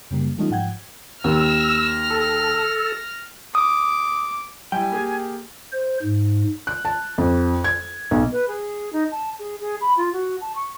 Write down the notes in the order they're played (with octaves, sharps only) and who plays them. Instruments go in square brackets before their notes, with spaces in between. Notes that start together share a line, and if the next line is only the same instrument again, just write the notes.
[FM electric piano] F#2 C#3 G3 A#3
E3 G3 A3 C#4 D#4 F4
G#2 F3 F#5 G5 G#6
[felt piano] D#2 [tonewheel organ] E6 [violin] F6 A#6
[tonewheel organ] A4
[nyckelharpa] D6 [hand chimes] D#6
[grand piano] G3 E4 [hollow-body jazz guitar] G5 [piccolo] G#5
[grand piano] A#3 G4 G#4
[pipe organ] C5
G#2
[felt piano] F#6
A5
F2
G#6
B1
[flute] B4
G#4
D#4
A5
G#4
G#4
B5
F4
F#4
A5
C#6